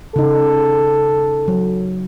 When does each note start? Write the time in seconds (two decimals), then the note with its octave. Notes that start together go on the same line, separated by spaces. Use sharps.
0.16 C#3 D#4 A4
1.48 F#3